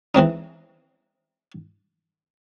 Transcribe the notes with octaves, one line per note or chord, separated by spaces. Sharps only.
E3 G#3 C4 D#4